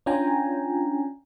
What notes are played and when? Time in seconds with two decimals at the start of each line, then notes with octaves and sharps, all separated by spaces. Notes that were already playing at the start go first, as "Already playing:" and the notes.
0.06 C#4 D4 F4 G5 G#5 A#5